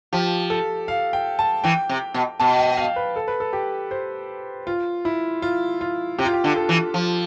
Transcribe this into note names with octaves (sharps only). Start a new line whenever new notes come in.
F3 G4
A4
F5
G5
A5
E3 G5
C3
B2
B2 A5
G5
F5
B4
A4
B4
A4
G4
C5
F4
E4
F4
F4
C3 G4
F4
G4
D3
A4
E3
F3